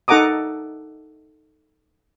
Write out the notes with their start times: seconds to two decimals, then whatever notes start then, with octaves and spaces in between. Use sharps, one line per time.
0.08 D#4 A4 F#5 A#5 D6 D#6